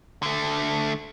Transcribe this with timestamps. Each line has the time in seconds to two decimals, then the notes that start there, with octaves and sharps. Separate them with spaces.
0.22 D3 A3